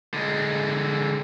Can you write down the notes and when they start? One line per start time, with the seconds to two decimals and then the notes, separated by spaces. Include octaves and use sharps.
0.14 D3 G#3